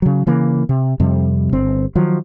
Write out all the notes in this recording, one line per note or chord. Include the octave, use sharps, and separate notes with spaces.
C#3 F#3
C#3 E3 A#3
C3
F2 C3 G3
G1 C4
D#3 F3 F#3